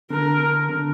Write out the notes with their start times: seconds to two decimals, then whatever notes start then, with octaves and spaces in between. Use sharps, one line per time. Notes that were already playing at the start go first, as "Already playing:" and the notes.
0.10 D3 A#4
0.69 D3